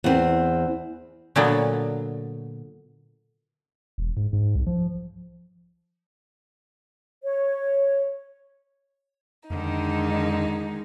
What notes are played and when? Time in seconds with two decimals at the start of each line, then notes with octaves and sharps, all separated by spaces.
0.04 E2 C4
1.36 A#2 D3 F#3 B3
3.98 E1
4.17 G#2
4.33 G#2
4.56 C2
4.67 F3
7.23 C#5
9.50 F2 D3 D#3 G#3 D#4